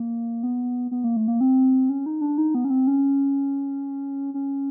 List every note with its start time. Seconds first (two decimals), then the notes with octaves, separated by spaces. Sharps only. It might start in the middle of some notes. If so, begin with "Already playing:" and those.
Already playing: A#3
0.43 B3
0.91 B3
1.04 A#3
1.17 A3
1.28 A#3
1.41 C4
1.89 C#4
2.06 D#4
2.21 D4
2.38 D#4
2.55 B3
2.65 C#4
2.70 C4
2.87 C#4
4.34 C#4